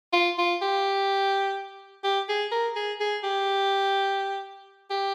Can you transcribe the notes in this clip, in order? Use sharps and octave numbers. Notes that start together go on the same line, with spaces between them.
F4
F4
G4
G4
G#4
A#4
G#4
G#4
G4
G4